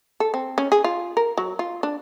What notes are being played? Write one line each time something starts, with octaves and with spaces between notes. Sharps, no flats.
A4
C4
C#4
G#4
F4
A#4
F#3
F4
D4